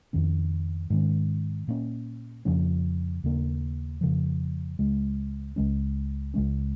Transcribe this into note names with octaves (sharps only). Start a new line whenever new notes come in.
F2 D#3 C#4
G#2 D#3 C#4
A#2 A#3 C#4
F2 C#3 F3 C#4
D#2 C#3 A#3
F2 C#3 F3
C#2 C#3 G#3
C#2 C#3 G#3 C#4
C#2 C#3 G#3 C#4